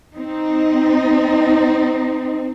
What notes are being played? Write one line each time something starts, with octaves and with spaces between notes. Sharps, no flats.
C4 D#4